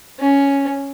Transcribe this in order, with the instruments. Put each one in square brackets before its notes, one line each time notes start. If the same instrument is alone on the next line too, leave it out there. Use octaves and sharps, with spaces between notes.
[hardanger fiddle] C#4